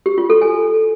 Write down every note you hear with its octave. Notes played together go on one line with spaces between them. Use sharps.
G4
F4
A4
G#5